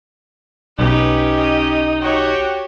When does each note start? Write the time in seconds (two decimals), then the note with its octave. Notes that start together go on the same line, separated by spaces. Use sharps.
0.79 B1 C#4 D#4 G4 B4
1.36 D#5
2.02 F#4 G4 C#5 G5